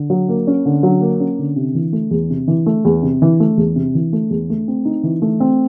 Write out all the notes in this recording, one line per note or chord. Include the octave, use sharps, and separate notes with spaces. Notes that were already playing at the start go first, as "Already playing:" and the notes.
Already playing: D3
F#3
A#3
C#4
D3
F#3
A#3
C#4
D3
C3
E3
A3
E2
C3
E3
A3
E2
C3
E3
A3
E2
C3
E3
A3
E2
A3
C4
D#4
E3
A3
C4